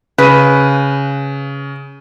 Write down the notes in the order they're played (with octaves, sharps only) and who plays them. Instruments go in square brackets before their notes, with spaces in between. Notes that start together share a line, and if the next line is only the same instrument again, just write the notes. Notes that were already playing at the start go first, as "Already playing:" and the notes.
[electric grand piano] C#3 D#7 [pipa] B4